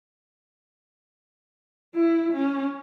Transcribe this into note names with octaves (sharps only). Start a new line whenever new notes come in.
E4
C#4